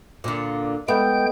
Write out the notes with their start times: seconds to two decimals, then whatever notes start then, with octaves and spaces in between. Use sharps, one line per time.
0.24 A#2 D3
0.88 G#3 A3 B3 G5 G6